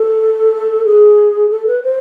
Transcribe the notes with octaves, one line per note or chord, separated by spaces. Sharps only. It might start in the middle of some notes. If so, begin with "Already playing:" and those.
Already playing: A4
G#4
A4
B4
C5